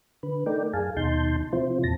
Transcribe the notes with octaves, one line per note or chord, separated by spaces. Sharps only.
D3 B4
A3 D#4 A#4 D5 G5
F#2 G#4 F5 G#5 A5
D#2 B2 D#4 A5 C6 G6
C3 F3 C4 E4 F4 C5
E2 A#2 A5 A#6